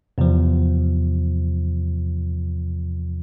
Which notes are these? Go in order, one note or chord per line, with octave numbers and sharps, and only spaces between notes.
E2 C3 F3